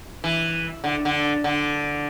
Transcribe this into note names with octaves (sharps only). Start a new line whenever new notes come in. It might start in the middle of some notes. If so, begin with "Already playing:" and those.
E3
D3
D3
D3